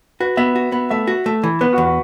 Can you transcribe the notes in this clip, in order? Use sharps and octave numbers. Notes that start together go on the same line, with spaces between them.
F#4 B4
B3 E5
F#4
B3
A3 E5
F#4
A3
E3
B3 B4
F#4
E2
F#4